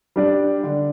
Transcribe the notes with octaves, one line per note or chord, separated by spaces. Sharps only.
G3 D4 G4 D5
D3